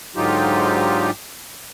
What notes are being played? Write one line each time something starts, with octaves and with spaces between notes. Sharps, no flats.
G#2 D3 F#3 D#4 F4 G4